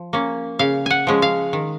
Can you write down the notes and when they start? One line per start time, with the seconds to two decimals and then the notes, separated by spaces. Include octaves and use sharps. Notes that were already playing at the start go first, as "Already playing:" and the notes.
Already playing: F3
0.13 A#3 C#4
0.59 C#3 F5
0.86 F#5 G#5
1.07 F3 G#3 C#4
1.22 F5
1.53 D#3